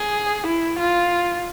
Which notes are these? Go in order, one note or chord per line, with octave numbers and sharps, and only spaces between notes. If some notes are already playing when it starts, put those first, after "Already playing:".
Already playing: G#4
E4
F4